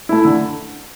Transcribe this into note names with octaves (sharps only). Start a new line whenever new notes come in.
A3 E4
D3